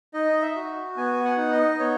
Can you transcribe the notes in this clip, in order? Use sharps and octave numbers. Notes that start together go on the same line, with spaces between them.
D#4 D#5
E5
F#4
B3 G#5
F#5
D#4
D#5
B3 C#5